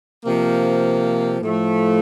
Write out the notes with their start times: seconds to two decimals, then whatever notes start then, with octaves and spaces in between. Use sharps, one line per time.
0.24 C3 F3 A#3
1.41 A2 F3 A3